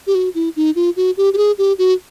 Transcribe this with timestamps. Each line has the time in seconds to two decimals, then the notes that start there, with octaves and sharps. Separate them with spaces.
0.07 G4
0.15 F#4
0.35 E4
0.56 D#4
0.76 F4
0.96 F#4
1.17 G4
1.33 G4
1.37 G#4
1.58 G4
1.78 F#4